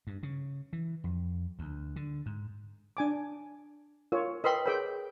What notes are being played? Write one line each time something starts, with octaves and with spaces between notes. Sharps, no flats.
G2
C#3
E3
F2
D2
D3
G#2
D4 G#5 D6
F4 A#4 C#5
A#4 B4 D#5 G5 B5 C6
G#4 A#4 C#5 G5 B5